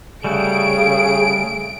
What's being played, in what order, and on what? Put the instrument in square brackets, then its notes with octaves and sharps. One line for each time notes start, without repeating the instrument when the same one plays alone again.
[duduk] C#3 [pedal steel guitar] G3 A3 F#4 [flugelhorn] G#4 [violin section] D7